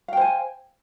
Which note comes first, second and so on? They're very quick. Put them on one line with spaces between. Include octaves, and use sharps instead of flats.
F5 G5 C5 G#5